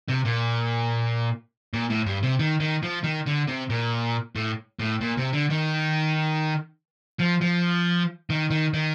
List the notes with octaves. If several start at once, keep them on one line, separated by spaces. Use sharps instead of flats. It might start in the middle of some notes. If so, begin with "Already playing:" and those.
C3
A#2
A#2
A2
G2
C3
D#3
D#3
F3
D#3
D3
C3
A#2
A2
A2
A#2
C3
D3
D#3
F3
F3
D#3
D#3
D#3